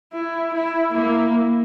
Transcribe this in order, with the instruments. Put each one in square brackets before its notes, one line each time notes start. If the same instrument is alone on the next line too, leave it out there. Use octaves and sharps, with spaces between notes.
[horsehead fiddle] E4
E4
[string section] A#3 [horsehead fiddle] E4